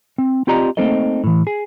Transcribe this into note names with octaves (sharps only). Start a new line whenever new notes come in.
C4
C4 F4 G4 D5 D#5 A#5
A3 A#3 C4 D#4 A4 D#5
A2 E3
G#4